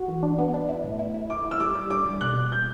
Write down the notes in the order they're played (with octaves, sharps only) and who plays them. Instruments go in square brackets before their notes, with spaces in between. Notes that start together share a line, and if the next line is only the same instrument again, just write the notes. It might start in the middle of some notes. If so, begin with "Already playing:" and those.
Already playing: [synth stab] F#4
E3
D4
B3
D4
E4
A2
E4
E4
[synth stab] E4 [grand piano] D6
[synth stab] E4
[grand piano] E6
[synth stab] G3 [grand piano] D6
[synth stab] G3
[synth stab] D4 [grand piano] D6
[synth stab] G3
[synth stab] B2 [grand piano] F#6
[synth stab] B2
[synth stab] B2 [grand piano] G6